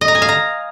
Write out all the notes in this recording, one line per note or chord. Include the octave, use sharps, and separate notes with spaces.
D#5
A#5
G#5
F5
A#5